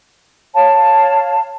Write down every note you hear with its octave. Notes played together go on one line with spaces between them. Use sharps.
C#5 F5 A5